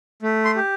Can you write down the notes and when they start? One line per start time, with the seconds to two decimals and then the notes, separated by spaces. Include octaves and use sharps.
0.22 A3
0.45 C6
0.56 G4